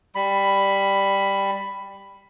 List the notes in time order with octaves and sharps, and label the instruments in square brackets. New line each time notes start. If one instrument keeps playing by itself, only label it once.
[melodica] G3 B5